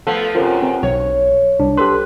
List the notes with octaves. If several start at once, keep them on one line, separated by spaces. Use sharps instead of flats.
F3 A3 B3 A4
F#2 C3 F4 A#4 C5
C4
B1 C#5
C2 D4
G4 A4 B4 C6